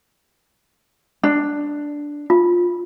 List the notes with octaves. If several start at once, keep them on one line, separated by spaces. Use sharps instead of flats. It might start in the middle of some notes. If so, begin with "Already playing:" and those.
D4
F4